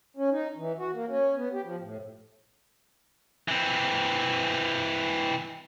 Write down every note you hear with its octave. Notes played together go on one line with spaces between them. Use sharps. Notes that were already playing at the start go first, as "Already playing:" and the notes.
C#4
D#4
E3
F#4
A#3
C#4
B3
G4
F3
A2
E3 C4